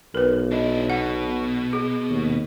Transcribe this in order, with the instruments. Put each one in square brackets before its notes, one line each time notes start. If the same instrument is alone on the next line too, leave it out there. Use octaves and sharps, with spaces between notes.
[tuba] B1 [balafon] A#4 B4
[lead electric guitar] D4 E4 [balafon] D#5
[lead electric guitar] B2 [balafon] F#5
[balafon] G#4
[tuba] D#2